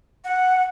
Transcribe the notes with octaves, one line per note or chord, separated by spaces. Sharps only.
F#5